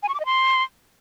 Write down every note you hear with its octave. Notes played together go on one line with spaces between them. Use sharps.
G#5
C#6
D6
D#5
C6